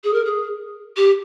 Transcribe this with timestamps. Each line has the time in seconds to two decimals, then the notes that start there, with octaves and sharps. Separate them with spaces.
0.04 G#4
0.13 A#4
0.25 G#4
0.96 G4